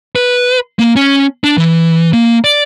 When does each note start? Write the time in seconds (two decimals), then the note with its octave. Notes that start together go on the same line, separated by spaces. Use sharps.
0.16 B4
0.79 A#3
0.96 C#4
1.44 D4
1.58 E3
2.13 A#3
2.44 D5